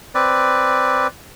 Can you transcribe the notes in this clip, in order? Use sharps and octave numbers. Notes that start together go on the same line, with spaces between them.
C4 B4 D5